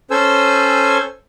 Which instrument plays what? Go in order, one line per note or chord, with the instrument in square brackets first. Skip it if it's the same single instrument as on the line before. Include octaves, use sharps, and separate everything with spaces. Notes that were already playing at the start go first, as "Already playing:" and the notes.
[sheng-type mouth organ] C#4 A4 C5 G#5 E6